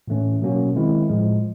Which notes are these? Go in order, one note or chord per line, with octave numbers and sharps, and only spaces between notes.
A2 E3 A3 C#4
B2 F#3 A#3 C#4 F#4
D#3 G#3 C4 E4
A2 F3 G#3